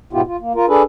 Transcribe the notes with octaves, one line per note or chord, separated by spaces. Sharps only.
G#2 B2 B3 E4 F4 G4
F4
A#3
F4 A#4
D4 G#4 A4 B4